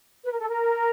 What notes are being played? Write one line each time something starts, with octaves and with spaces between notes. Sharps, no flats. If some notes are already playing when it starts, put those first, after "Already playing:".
B4
A#4
A4
A#4